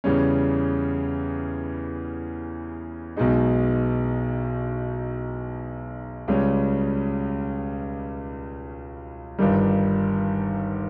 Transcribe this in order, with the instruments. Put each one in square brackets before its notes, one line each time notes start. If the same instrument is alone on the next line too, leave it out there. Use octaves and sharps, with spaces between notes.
[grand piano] E2 C#3 G3 C#4
B1 B2 G#3 D#4
C#2 C#3 G3 C#4
G1 G2 D#3 G3